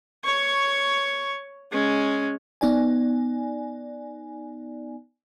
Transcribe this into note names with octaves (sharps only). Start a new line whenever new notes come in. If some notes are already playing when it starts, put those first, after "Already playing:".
C#5 C#6
G#3 C#4
B3 D#4 D5 G#5